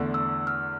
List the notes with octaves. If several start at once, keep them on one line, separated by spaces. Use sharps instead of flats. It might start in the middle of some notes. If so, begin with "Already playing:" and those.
Already playing: E2 D3 A3
E6
F6